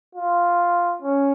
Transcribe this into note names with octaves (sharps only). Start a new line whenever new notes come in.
F4
C#4